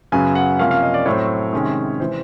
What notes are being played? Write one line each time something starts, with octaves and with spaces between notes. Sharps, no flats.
F#2 C#3 F#3 B3 G#5
F#5
C3 F3 A#3 C#4 F5
F5
D#5
D5
A2 F#3 A3 C4 C#5
C3 D#3 G#3 C#4
C3 E3 C5